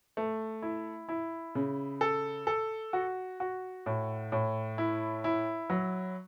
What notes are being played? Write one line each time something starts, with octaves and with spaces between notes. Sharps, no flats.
A3
E4
E4
C#3
A4
A4
F#4
F#4
A2
A2
E4
E4
F#3